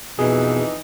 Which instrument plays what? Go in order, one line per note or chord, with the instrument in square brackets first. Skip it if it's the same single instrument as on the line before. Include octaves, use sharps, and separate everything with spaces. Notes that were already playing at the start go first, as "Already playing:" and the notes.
[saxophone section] F2 E3 D#4 [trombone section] B2 [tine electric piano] G#4